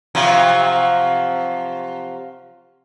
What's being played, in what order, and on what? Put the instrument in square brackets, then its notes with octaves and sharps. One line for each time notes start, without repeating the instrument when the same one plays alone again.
[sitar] C3 F3 F#3